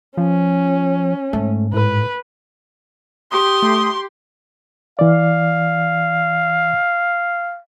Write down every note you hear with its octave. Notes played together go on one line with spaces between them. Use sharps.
F3 C#4
G#2 A3
A2 B4
G4 C6 D#6
A3
E3 D5 F5